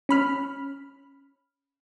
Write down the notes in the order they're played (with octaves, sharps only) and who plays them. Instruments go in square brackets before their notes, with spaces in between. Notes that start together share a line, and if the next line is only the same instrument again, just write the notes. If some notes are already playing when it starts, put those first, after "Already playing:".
[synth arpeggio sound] C#4 B5 F6